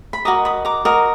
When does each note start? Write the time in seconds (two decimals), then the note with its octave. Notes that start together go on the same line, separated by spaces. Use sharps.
0.13 B5
0.25 F#4 A#4 D#5 A#5 D6
0.45 B5 D#6
0.65 A#5 D6
0.85 F#4 A#4 D#5